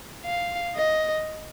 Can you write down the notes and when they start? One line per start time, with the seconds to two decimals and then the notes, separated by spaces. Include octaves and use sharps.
0.25 F5
0.76 D#5